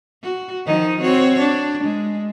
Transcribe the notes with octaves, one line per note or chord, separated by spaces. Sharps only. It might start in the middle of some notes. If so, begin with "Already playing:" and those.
F#4
D#3 F3 D#4
C4 F#4 C#5
D4
G#3